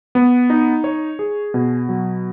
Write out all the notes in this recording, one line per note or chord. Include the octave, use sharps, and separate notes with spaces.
B3
D#4
C#5
G#4
B2
F#3